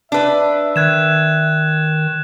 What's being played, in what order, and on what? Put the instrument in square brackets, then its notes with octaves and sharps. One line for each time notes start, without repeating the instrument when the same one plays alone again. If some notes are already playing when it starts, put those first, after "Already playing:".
[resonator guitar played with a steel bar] D4 B4 [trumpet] E5
[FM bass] D#3 [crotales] F#6 G#6 E7